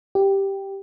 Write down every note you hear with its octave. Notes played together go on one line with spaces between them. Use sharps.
G4